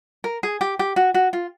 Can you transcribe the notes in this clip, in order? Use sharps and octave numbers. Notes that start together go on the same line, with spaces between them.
A#4
G#4
G4
G4
F#4
F#4
F4